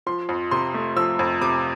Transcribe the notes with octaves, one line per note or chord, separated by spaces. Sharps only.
F3 C6
F2
C3 C6
A3
F3 E6
F2
C3 D6